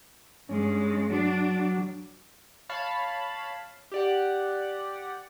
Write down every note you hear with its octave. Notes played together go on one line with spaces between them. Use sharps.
G2 G#3 C#4
F#3 D4
C#5 F5 A5 B5
G4 D5 F#5